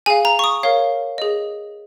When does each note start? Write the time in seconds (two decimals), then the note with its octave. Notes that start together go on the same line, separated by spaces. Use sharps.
0.06 G#4 F5 G#5
0.25 A#5
0.39 C#6
0.44 D#6
0.63 A#4 C#5 F5
1.18 G#4 D#5